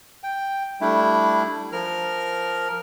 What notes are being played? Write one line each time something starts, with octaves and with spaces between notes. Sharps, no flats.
G5
G3 A3 D4 E4
F3 A#4 F6